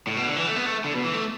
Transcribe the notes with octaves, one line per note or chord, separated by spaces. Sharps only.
A2
B2
D3
E3
A3
B3
A3
D3
B2
E3
A3